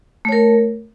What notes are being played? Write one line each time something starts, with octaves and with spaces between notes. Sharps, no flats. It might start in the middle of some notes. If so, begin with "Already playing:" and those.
A3 A#4 C#5